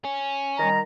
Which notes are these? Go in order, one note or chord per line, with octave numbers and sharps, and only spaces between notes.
C#4
D#3 G3 A#5